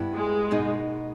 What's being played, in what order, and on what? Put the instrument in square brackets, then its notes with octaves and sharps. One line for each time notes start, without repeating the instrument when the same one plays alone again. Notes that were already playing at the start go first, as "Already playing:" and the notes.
Already playing: [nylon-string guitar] G2 G3 B3 E4
[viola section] G#3
[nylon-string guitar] B2 A#3 D#4